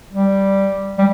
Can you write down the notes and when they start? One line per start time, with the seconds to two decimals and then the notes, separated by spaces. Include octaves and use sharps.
0.13 G3
0.98 G3